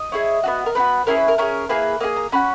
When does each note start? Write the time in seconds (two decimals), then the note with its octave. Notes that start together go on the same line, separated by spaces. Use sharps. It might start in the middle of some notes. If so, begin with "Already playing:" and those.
Already playing: D#5
0.12 C#4 E4 G#4
0.43 B3 D#4 F#4
0.66 A#4
0.75 B3 D#4 B4
0.80 F#4
1.07 C#4 E4 G#4 A#4
1.17 B4
1.28 A#4
1.38 C#4 E4 A#4
1.42 G#4
1.69 A#3 E4 G#4 B4
2.00 A#3 E4 G#4 D#5
2.16 A#5
2.32 C#4 F#4 B5